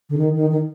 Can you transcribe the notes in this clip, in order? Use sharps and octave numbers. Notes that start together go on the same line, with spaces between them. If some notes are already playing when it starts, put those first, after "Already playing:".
D3
D#3
D#3
D#3